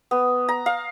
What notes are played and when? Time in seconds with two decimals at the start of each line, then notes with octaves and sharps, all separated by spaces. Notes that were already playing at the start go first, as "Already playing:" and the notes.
0.11 B3
0.49 A#5
0.66 F5